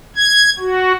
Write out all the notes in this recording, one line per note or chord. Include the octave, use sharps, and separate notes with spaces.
G#6
F#4